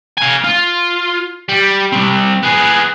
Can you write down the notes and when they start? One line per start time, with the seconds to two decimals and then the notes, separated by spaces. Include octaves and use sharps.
0.17 F5 G#5
0.44 F4
1.49 G3
1.92 G3 C4
2.43 B3 G#4